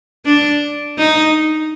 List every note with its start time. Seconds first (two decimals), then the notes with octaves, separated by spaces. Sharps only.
0.26 D4
0.98 D#4